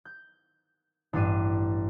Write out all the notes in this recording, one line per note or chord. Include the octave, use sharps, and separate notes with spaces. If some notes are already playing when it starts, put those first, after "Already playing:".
G6
A1 G2 D4 D#7